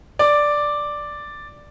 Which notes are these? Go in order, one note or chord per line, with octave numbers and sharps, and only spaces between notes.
D5